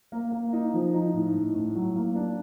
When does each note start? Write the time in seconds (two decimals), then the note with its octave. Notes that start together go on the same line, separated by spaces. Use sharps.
0.12 A#3
0.32 A#3
0.53 D#4
0.73 F3
0.94 D#4
1.13 A2
1.34 A2
1.55 A2
1.75 F#3
1.96 A#3
2.15 D4